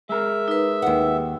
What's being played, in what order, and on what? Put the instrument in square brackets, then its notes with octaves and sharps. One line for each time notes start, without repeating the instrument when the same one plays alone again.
[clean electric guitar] G#3 A#4 [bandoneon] E5
[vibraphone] D#4 B4
[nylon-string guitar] D#2 F#5